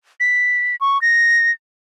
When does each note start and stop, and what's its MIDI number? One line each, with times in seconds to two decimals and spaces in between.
0.20 0.76 95
0.81 1.00 85
1.02 1.51 94